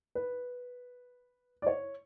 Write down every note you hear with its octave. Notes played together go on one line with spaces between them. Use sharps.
B4
D5
C#5